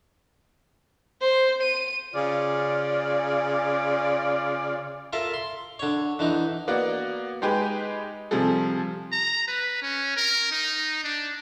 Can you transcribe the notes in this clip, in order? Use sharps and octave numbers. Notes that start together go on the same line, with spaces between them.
C5
D#7
C#3 F4 D5
F4 A4 A#4 E5
C6
D3 C#5
D3 E3 D#4
A#3 B3 F#4 D5 F#5
G#3 D#4 G4 G#4 B4
C3 F3 G3 G#4 A4
A#5
B4
C#4
A#4
D#4
D4